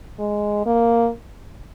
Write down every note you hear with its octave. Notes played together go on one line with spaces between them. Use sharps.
G#3
A#3